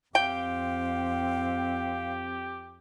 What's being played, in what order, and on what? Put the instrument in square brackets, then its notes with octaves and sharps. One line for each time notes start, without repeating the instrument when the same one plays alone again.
[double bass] F2 C4 [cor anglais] G4 [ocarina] F5 [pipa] G5